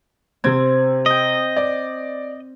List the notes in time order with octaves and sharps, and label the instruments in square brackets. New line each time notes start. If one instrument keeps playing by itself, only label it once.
[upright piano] C3 G#6 [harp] C4
[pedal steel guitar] D#5 [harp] G5 D#6
[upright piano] D5